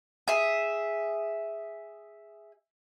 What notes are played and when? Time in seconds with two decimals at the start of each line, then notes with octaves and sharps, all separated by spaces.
0.28 G#4 E5